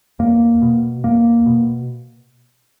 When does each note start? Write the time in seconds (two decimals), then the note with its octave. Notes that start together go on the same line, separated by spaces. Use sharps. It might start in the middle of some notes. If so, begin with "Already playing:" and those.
0.19 E2 A#3
0.62 B2
1.04 E2 A#3
1.46 B2